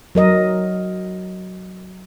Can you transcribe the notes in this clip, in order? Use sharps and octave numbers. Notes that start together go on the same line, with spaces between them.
F#3 A#4 D#5